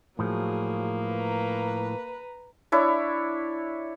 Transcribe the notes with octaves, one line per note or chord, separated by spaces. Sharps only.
A2 F3 F#3 A#3 G#4
B4 A#5
D4 E4 C#5